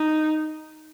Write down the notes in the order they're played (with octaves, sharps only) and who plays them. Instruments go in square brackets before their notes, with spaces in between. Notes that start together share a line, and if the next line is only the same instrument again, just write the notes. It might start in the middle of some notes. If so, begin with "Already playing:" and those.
Already playing: [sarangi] D#4